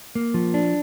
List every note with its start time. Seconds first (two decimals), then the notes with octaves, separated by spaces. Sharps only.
0.15 A#3
0.34 F3
0.54 D4